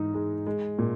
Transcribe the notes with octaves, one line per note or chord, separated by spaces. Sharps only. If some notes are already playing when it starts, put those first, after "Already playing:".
Already playing: G#2 E3 D#4
G#3
G#3
A#2